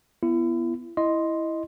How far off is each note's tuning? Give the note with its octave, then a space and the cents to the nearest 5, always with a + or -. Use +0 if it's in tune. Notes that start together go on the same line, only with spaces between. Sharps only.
B3 +0 E4 +35
E4 +0 D#5 +0 C6 +0